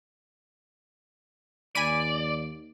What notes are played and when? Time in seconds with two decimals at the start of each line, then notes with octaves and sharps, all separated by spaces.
1.75 D#2 D5 G#5 B5 D#7